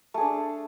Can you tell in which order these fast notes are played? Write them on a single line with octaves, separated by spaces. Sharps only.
A3 G#4 D4